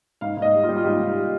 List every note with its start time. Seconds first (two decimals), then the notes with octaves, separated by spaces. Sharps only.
0.21 G#2 F5
0.37 G#2
0.42 D#5
0.53 G3
0.63 F4
0.69 G3
0.77 F4
0.84 G#2 G4
1.00 G#2
1.16 G3